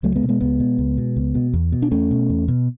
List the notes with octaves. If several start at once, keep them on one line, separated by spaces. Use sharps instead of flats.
C#2 F#3 A3
G#3 B3
B2
G#3 B3
C#2 G#3 B3
B2
C#2
B2
C#2
B2
E2
B2
D4
E2 A3 C#4
B2
E2
B2